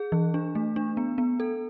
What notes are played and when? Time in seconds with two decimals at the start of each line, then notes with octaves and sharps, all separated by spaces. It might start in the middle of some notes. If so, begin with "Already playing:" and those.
Already playing: G#4
0.12 E3
0.34 D4
0.55 A3
0.76 D4
0.97 B3
1.18 B3
1.40 A4